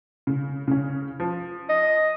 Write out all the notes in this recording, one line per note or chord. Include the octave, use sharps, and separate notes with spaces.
C#3
C#3 C#4
F3
D#5